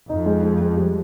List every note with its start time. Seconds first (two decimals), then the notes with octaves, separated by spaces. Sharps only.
0.09 F2 D#4
0.26 G#3
0.43 G#3
0.61 G#3
0.77 G3